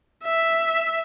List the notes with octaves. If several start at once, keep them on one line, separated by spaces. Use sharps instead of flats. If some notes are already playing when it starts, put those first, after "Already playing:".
E5